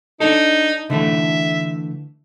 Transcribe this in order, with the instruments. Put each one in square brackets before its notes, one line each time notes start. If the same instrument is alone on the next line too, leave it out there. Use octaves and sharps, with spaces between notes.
[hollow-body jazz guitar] D4 A4 [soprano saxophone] D#4
[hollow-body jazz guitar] D3 E3 A3 [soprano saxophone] E5